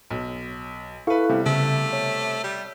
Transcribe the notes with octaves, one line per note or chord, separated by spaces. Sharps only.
B1
E4 A4 B4 F5 C#6
C3 G3 B3
C#3 A3
C#5
G3